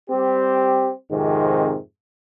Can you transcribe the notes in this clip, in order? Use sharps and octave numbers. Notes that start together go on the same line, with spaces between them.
G3 C4 G4
F2 G#2 C3 D#3